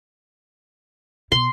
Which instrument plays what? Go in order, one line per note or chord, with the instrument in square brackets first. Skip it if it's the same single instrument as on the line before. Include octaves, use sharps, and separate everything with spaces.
[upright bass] B2 [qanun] C6